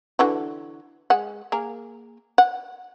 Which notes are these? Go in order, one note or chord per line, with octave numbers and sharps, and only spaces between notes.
D3 E3 F#4
G#3 F#5
A#3 G#4 A#4
F#5